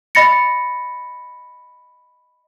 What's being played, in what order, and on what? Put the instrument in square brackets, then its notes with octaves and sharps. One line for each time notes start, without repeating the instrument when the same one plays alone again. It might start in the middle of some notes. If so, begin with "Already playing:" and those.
[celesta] D#5 B5 A6 A#6 C#7